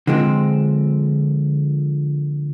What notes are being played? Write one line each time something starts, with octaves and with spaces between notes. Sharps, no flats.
D3 F3 G#3 C4